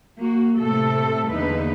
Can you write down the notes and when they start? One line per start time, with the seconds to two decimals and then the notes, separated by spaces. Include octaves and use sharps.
0.18 A#3 F#4
0.59 A2 C3 A3 A4
1.31 E2 D3 A#3 D#4 B4